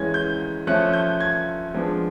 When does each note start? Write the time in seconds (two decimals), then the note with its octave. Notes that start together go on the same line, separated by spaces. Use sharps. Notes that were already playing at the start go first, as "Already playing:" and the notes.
Already playing: E3 G#3 C#4 G#6
0.14 G6
0.67 F3 A3 C#4 F#6
0.93 G6
1.21 G#6
1.74 F3 G#3 B3 D4